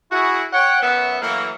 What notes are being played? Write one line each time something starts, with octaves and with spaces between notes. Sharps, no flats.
E4 F#4 G#4
C#5 F#5 G5
F#2 B3 E5
E3 F#3 A3 A#3